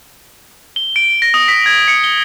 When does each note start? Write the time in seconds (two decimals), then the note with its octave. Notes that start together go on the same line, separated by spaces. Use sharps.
0.76 G7
0.96 D7
1.22 A#6
1.34 D#6
1.48 B6
1.66 G#6
1.88 C#7
2.04 G7